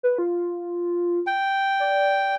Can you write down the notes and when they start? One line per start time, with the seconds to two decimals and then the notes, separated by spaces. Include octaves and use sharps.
0.03 B4
0.18 F4
1.27 G5
1.80 D5